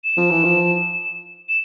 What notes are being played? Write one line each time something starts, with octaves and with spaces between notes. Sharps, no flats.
E7
F3
E3
F3
E7